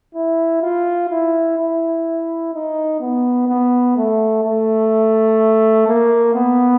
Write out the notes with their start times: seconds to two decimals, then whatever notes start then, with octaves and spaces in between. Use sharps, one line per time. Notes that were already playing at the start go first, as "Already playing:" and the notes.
0.15 E4
0.62 F4
1.10 E4
1.58 E4
2.54 D#4
3.00 B3
3.48 B3
3.97 A3
4.44 A3
5.87 A#3
6.35 B3